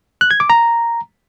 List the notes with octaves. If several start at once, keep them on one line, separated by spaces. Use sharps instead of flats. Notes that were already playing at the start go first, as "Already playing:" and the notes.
F#6
G#6
D6
A#5